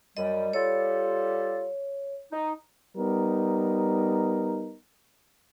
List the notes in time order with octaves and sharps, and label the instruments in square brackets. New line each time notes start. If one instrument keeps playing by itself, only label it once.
[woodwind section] F#2 G3 [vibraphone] D#5
[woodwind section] G3 F4 A4 [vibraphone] C#5
[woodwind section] D#4
[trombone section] G3 B3 D#4 A#4